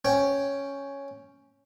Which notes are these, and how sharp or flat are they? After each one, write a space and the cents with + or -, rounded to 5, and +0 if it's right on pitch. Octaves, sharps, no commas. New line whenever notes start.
C#4 +0 G5 +0